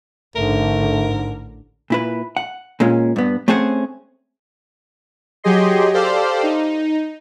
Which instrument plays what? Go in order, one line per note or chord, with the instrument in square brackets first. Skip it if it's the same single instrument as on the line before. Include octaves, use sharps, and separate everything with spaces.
[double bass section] A1 D3 [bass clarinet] G#2 [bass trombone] A3 [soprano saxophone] A#4
[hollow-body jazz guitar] A#2 E4 B4
F#5
A#2 G#3 C#4
G2 B3
A3 C4 C#4 G#4 C5 F#5
[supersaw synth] F#3 G4 G#4 D#5 C6
G4 A4 C5 D5 F5
D#4